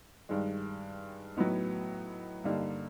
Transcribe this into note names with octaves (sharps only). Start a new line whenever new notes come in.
G2 D#3 G#3
A2 F#3 B3 D#4
G2 D3 G3 A#3 D#4